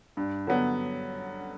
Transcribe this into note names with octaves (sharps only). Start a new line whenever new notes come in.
G2
D3 F#3 B3